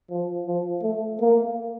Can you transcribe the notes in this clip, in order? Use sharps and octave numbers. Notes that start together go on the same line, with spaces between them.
F3
F3
A3
A#3